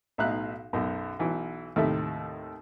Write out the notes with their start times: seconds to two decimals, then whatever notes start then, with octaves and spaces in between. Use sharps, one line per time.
0.18 B1 A2 D#4 E5 F5 F#6
0.73 B1 F#2
1.19 B1 E3 F#3
1.76 D#2 A2 C3 A4 E5